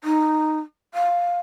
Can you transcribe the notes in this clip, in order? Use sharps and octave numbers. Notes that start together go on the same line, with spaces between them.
D#4
F5